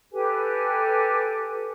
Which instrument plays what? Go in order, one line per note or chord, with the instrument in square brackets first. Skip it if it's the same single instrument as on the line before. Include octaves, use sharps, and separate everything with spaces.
[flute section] G4 A4 B4 G#5